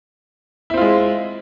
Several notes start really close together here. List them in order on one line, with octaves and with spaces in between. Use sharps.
E4 C4 F4 G#3